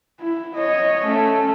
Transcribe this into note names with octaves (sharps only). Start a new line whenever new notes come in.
E4
C#5 D#5
A3 C#4